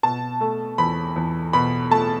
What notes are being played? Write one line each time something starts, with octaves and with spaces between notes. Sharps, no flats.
B2 A5
A3
E2 B5
E2
B2 B5
A3 A5